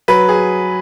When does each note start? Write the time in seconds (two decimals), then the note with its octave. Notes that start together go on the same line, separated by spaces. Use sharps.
0.08 F#3 B4
0.28 G#4